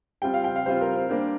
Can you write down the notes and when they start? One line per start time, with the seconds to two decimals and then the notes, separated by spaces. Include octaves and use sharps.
0.22 G3 C4 F4 G5
0.34 F5
0.44 G5
0.56 F5
0.66 G3 C4 F4 C5
0.81 A#4
0.96 C5
1.09 G3 A#3 D4 G4 C5